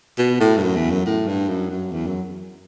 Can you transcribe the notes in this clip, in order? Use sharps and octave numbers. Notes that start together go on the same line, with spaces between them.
B2
A2
G2
F#2
E2
F#2
A2
G2
F#2
F#2
E2
F#2